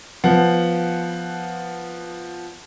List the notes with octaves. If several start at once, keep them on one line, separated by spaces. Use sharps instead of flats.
F3 B3 F#5